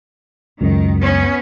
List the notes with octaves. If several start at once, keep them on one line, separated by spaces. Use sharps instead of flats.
C#2 F#2 D#3
B3 C#4